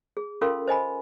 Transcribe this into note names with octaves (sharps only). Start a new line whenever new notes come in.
G#4
C#4 F4 A4 A#4 F5 C6
C5 D#5 G#5 B5